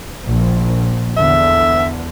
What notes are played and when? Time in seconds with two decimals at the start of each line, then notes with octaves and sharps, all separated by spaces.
0.24 A#1
1.17 E2 D3 E5